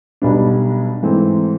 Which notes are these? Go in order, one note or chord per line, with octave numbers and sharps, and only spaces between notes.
B1 B2 G3 B3 D4
G#2 E3 A3 C4